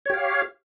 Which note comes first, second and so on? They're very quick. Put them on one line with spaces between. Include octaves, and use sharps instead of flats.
C#5 G4 F5